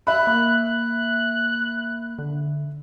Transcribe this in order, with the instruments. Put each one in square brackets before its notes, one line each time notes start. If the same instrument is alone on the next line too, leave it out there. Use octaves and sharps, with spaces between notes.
[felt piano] E5 B5 [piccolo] F#6
[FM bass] A#3
[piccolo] F#6
[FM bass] D3